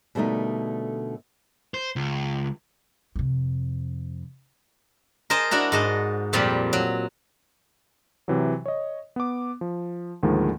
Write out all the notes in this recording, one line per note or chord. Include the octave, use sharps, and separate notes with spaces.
B2 D3 G3 A3 A#3 D#4
C5
C#2
F2 C3
A#4 C5 D#5 G#5 A5
D4 E4 F#4 A#5
G#2 D#5 A5
F2 A#2 F3 G3 B5
F#3
C3 E3 F#3
C#5 D#5
B3 D6
F3
D2 G#2 D#3 F3 G#3 A#3